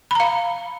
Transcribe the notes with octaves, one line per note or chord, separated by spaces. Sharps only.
F5 A#5 B5